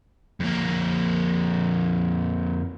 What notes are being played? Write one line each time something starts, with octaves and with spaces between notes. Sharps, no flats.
F2 A#3